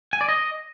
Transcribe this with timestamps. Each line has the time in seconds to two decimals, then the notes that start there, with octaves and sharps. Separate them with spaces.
0.13 G#5
0.21 D5
0.29 D#5